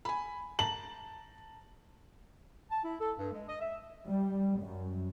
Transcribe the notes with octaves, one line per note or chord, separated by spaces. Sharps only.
G#5 B5
A5 A#5 F#7
A5
E4
A4
G2
G#3
D#5
E5
G3
F#2